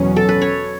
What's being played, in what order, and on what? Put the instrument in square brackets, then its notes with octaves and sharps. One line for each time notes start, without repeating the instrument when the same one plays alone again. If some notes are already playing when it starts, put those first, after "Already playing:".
Already playing: [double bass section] E2 B2 F#3 C#4 [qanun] F#4
[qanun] A4
B4
C#5